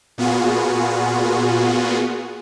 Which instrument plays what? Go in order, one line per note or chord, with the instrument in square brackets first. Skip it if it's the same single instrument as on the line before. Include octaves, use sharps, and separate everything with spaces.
[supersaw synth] A#2 B3 F4 F#4 G#4